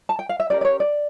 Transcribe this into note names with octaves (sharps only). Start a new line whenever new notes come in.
A5
G5
F5
E5
C#4 G4 A#4 D5
D5
C#5
D5